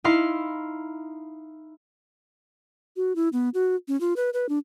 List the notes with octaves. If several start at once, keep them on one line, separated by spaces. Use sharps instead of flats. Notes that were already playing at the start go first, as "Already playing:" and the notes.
D#4 E4 F5 C6
F#4
E4
B3
F#4
C#4
F4
B4
B4
D4